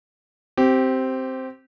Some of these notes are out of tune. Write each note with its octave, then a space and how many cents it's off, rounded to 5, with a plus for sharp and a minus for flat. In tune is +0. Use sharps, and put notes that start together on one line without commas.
C4 +0 G4 -20